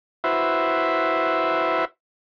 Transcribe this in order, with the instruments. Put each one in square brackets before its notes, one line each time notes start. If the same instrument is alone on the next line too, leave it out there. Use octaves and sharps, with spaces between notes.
[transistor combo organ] E4 F#4 B4 C5 E5